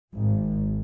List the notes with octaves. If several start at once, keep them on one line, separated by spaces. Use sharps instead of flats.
G#1